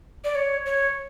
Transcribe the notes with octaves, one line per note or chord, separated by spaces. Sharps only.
D5
C#5
C#5